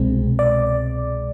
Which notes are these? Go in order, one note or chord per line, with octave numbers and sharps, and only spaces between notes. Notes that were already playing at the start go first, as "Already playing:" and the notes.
Already playing: C2 B2 G#3 C4
D5